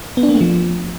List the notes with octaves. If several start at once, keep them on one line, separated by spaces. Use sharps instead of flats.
B3
D4
A#3
A3
F3